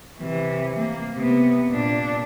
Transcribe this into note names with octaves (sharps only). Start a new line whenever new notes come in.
C3 E3
A#3
C3 B3
A#2 D4